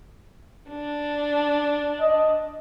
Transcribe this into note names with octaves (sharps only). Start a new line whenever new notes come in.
D4
D#5